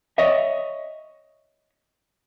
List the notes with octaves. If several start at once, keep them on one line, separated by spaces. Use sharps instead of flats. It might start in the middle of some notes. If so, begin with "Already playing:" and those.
C#5 D#5 E5